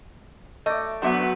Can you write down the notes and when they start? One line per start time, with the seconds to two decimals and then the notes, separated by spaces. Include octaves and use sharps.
0.66 A3 D5 D#5
1.02 F#3 B3 D4 F#4 B4 C5 D5 E5